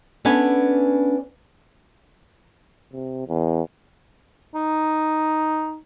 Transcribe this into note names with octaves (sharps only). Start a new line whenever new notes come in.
B3 C#4 D4 A4 B4 G#5
C3
E2
D#4